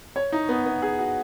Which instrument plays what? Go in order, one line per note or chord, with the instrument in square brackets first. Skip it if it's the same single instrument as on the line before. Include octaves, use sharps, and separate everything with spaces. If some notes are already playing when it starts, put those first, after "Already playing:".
[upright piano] C#5
D#4
B3
B3
G#4
F#4